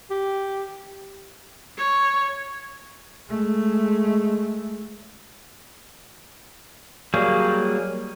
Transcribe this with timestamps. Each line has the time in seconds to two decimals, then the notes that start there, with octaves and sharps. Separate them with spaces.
0.10 G4
1.77 C#5
3.29 G#3 A3
7.14 F#3 G3 A#3 G#4